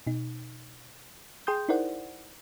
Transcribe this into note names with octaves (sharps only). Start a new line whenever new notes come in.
B2 D#4
G#4 G5 C6 D#6 G6
D#4 E4 A#4 C5 D5 F#5